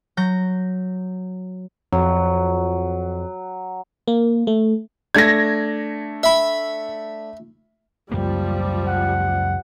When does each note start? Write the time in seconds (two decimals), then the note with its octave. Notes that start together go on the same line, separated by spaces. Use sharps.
0.17 F#3 G6 A#6
1.92 F2 F#3
4.08 A#3
4.47 A3
5.15 A3 D4 G#6 A#6
6.23 E5 B5
8.11 C#2 F#2 F3 G3 A#3
8.87 F#5